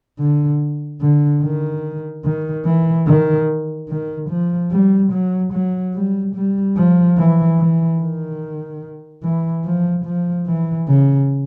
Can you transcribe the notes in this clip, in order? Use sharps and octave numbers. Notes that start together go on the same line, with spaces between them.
D3
D3
D#3
D#3
E3
D#3
D#3
F3
G3
F#3
F#3
G3
G3
F3
E3
E3
D#3
E3
F3
F3
E3
C#3